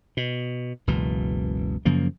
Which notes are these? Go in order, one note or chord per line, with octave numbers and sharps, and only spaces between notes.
B2
F#1 C#2 B2 E3
F#2 C#3 F3 A#3